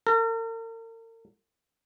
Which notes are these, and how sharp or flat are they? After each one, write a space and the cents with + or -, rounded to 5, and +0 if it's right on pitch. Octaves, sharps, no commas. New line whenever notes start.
A#4 -45